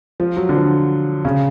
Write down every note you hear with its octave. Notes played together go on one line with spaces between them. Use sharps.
F3
F#3
D3
F3
C#3